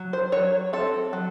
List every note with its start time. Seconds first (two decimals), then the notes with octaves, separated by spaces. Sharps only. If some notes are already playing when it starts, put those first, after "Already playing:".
Already playing: F#3
0.13 C5
0.32 F#3 C#5
0.73 C4 A4
1.13 F#3